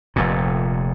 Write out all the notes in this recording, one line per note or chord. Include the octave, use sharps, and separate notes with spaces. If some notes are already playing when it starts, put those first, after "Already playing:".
F1 F2 A#2